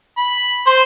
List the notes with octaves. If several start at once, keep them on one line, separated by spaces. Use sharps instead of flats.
B5
C5